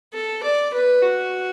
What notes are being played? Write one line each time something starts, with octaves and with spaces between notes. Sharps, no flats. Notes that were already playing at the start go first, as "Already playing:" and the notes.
A4
D5
B4
F#4